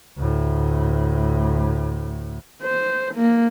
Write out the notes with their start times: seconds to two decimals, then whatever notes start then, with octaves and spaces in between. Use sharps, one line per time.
0.17 D2 A2
2.63 C5
3.15 A#3